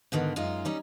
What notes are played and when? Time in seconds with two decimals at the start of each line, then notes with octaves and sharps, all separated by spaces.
0.12 G#2 D3 D#3 B3
0.36 F#2 G#3 D#4 F4
0.65 G3 C#4 D#4